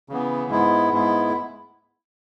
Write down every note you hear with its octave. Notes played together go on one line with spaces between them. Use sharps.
C#3 E3 B3
G#2 G#3 B3 E4
G#2 G#3 B3 E4